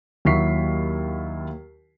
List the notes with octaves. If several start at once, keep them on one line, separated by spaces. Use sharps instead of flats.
D#2 F#3 E4 C#6 B6 C7